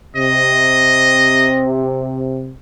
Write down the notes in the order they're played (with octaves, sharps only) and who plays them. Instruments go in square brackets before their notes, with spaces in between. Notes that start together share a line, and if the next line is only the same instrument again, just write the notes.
[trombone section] C3 [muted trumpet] D#5